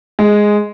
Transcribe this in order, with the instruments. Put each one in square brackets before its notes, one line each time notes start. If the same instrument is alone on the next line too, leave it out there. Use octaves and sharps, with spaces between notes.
[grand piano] G#3